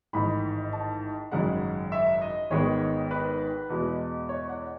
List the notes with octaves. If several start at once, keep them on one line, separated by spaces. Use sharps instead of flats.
A1 G#2 D#3 B5
A5
G#1 F#2 C#3 G#3 F#5
E5
D#5
G#1 G#2 D#3 G#3 B3 C#5
B4
E2 B2 G#3
C#5
F#5